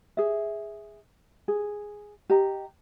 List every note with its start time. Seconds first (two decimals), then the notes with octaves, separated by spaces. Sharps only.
0.17 G#4 E5
1.48 G#4
2.30 G4 D#5 A#5